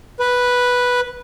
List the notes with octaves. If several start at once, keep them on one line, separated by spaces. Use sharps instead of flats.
B4